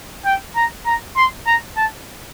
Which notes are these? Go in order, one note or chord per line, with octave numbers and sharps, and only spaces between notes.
G5
A#5
A#5
C6
A#5
A5